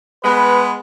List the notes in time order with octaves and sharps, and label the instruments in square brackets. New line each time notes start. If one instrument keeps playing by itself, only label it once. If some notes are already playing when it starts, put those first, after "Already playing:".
[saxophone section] G#3 B3 [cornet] B4